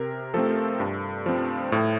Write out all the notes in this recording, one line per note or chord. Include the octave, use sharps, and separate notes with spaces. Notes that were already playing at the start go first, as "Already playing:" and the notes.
Already playing: C3 A#4
F3 A3 C4 A4
G2
F3 C4
A2